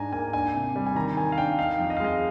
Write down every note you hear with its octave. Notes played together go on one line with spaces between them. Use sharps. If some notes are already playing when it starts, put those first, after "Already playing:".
Already playing: G#2 D4 G#5 A#5
A#3 G#5
D4 G#5
C3
G3
G#5
D#3 A#5
D#3 G#5
F5
D4 G5
D#4 F5
F2
D#5
F5
G#3 D#5